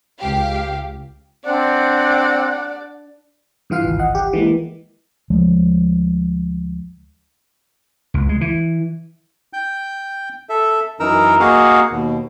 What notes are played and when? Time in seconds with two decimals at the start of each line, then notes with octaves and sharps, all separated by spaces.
0.19 C#2 G4 F5
1.46 C4 D4 D5 F#5
3.70 G2 E3 F4 F5 C7
3.84 G#1 C#2
3.99 D#5 F#5
4.15 G4
4.33 E3 G#3 A#3
5.30 D2 F3 G#3
8.14 C#2
8.29 G#3
8.41 E3
9.53 G5 G6
10.49 A4 E5
11.00 F#2 E3 D#4 A#4 A#5 E6
11.40 A#3 F#4 G#4 D#5 F5 F#5
11.91 D#2 B2